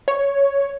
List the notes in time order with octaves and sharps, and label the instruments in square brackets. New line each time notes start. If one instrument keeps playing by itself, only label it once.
[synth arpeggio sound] C#5